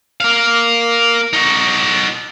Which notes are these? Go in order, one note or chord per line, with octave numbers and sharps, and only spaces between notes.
A#4 F5
D#4 F#4